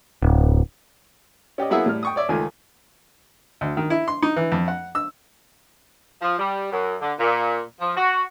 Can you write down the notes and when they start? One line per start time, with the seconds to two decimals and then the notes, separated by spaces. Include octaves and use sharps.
0.23 D1
1.58 C#4 G4 D5 D#5
1.70 F#3 A#3 B3 E4 G#4 E5
1.86 A2 G3 F6
2.03 G5 C#6 D#6
2.16 C#5 D5 E5
2.29 C#2 D#3 A3 F4 G#5
3.61 D2
3.77 D#3
3.90 E4
4.08 C6
4.23 D#4
4.36 E3
4.52 F2
4.68 F#5
4.95 E6
6.22 F3
6.39 G3
6.72 F#2
7.01 D3
7.19 A#2
7.80 F3
7.97 F#4